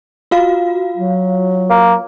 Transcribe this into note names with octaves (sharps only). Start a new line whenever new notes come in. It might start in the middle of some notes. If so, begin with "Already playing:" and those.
F4 F#4 F5
F#3
A#3